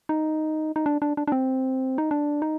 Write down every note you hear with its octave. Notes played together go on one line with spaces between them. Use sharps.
D#4
D#4
D4
D4
D4
D4
C4
D#4
D4
D#4